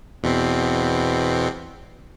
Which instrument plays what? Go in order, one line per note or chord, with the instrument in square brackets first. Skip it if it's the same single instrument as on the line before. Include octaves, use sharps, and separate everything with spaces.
[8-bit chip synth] E2 B2 C4